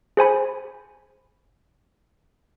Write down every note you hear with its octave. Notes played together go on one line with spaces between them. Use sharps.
G#4 C5 G#5 B5